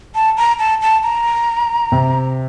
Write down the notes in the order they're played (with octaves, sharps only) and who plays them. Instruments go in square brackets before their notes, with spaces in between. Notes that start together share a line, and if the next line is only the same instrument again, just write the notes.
[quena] A5
A#5
A5
A5
A#5
[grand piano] C3